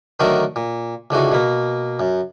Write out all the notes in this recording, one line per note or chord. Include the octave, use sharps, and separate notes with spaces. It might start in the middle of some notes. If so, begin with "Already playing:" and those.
D3 D#3 F#3 A3 A#4
A#2
C#2 D3 E3 F#4
B2 A#3
F#2